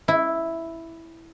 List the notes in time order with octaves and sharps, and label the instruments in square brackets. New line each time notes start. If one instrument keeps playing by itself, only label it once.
[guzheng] E4